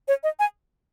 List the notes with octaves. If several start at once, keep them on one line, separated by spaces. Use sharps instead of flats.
C#5
D#5
G#5